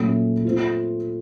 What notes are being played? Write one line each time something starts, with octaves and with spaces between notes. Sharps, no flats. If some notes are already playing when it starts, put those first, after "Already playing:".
Already playing: A#2 F#3 A3 C#4
A3 C4 F4